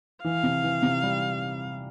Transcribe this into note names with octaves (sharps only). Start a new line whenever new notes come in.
E3 F5
C3
E3
C3
G3